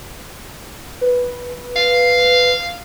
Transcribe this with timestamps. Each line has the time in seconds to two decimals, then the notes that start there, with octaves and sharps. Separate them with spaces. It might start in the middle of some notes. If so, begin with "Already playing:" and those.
1.01 B4
1.76 F5